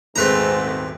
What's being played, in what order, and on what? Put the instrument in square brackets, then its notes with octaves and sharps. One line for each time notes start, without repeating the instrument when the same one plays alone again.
[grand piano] D#1 G#1 G#3 [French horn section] G#2 [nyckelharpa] A3 [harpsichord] C4 B4 A#5